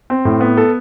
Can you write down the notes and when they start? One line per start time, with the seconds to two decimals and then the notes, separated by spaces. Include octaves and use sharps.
0.10 C4
0.25 A2
0.41 B3
0.57 A4